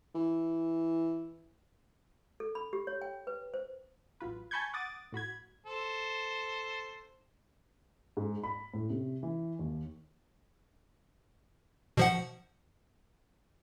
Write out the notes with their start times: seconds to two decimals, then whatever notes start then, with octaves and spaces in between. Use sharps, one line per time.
0.15 E3
2.40 A4
2.55 B5
2.73 G4
2.87 C#5
3.01 G5
3.27 B4
3.54 C5
4.20 A1 F#3 F4 B4
4.51 G#5 A5 B5 C#6 G6 G#6
4.73 F#5 D6 D#6 A6
5.12 A2 F#4 B5 G#6
5.66 A4 C5
8.17 G#2
8.44 B5
8.74 A2
8.90 C3
9.23 E3
9.59 D#2
11.97 B2 F3 F#5